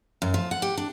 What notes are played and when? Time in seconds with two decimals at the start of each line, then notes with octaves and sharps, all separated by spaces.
0.22 F#2
0.34 F3
0.51 F#5
0.62 G4
0.77 D4